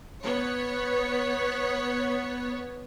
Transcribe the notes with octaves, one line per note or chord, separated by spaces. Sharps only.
B3 C#5